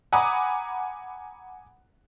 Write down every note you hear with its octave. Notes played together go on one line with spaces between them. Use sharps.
F#5 G#5 A#5 B5 D6 D#6